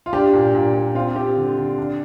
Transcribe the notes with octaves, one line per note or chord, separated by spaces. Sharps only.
F4
D4 G4
A#2
A#2
A#2
C4 F4
C4 G4
D3
D3
D4